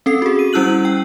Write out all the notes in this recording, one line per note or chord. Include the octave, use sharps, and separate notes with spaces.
C4 C#4 A4 C7
F#4 G#4
D#7
G3 C#4 E4 E6 F#6 F#7
G5